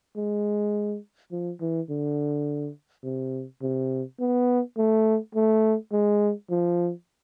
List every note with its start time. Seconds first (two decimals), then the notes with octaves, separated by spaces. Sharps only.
0.16 G#3
1.32 F3
1.61 E3
1.90 D3
3.04 C3
3.62 C3
4.20 B3
4.77 A3
5.35 A3
5.92 G#3
6.50 F3